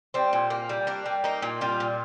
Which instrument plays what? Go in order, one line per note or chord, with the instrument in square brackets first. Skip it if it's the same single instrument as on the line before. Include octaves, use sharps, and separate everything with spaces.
[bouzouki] G3 C4
A#2
A#3
G3
A#3 D4
G3
A#3 D#4
A#2
G3 F4
A#2